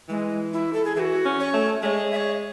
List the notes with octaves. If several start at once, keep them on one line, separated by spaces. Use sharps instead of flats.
E3 G#3
E4
A4
G#4
E3 F#4 G#4
C#4
C#5
A3
G#3 C#5 E5
E5
C#5